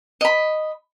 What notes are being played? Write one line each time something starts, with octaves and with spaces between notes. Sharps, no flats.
D#5 B5